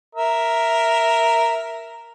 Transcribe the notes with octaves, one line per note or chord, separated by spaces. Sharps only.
A#4 E5